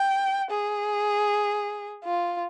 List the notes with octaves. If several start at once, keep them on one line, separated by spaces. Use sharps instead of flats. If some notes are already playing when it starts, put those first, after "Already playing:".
Already playing: G5
G#4
F4